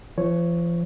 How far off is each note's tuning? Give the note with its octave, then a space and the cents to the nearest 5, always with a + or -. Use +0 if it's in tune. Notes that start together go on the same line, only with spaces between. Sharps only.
F3 -35 C#5 +0